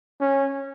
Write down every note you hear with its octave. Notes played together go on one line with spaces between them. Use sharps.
C#4